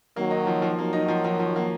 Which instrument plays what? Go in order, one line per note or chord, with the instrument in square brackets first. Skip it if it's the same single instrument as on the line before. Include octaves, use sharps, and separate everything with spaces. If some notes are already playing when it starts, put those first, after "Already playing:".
[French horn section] D#3 F#3 [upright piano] A#3
[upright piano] D#4
F3
F3
[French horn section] D#3 F#3 [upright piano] A#3
[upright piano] D#4
F3
F3
F3
A#3